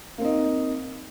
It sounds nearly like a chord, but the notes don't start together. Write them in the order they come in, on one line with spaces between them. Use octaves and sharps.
A#3 C4 D#4